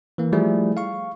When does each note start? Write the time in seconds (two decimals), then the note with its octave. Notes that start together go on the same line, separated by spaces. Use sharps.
0.18 E3 A#3
0.33 F3 G3 A3 E4 G#4
0.77 F5 C#6